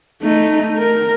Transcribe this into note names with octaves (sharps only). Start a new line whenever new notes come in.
A3 D#4
A#4